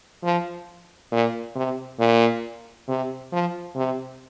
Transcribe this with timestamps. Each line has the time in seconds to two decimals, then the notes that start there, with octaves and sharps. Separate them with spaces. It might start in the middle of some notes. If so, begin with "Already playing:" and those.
0.23 F3
1.11 A#2
1.56 C3
1.99 A#2
2.88 C3
3.32 F3
3.76 C3